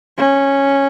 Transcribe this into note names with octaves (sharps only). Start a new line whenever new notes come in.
C#4